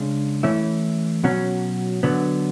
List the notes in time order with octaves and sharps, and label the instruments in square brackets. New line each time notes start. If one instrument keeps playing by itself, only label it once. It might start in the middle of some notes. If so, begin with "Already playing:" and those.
Already playing: [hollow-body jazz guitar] C#3 G#3 D4
E3 A3 C#4 E4
B2 F#3 C#4
D3 F#3 B3